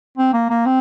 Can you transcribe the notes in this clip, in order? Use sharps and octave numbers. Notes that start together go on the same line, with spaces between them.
C4
A#3
A#3
C4